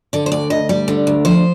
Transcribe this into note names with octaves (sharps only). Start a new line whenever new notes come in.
D3 D5
C5
D2 D5
D2 D#5
G3 D5
D3
D2
F3 C5